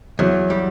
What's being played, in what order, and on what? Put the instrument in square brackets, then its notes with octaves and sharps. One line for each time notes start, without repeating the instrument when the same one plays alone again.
[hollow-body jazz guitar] E2 [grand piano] F#3
[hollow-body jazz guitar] G3